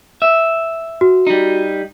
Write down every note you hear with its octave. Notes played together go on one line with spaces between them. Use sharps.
E5
F#4
G3 D#4